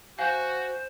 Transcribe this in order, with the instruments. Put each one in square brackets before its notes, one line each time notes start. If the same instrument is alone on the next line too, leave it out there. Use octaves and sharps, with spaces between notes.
[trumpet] F#4 [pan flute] C5 [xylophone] F5 G6 [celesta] G#5 C7